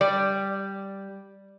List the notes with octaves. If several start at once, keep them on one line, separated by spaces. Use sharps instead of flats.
G3 D5